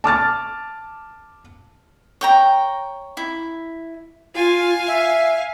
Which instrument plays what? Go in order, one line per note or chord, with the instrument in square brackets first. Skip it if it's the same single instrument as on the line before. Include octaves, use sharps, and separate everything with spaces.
[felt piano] A5 D6 F6 A6
[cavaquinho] C#5 G5 A#5
E4
[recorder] F4 [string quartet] F5 G#5
[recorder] E5